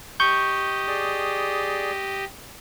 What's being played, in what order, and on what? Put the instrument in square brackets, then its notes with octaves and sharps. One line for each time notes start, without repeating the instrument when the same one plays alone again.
[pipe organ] G4 D#5 [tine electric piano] C#6 G6
[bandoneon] G#4 D5